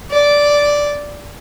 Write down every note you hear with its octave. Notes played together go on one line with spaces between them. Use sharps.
D5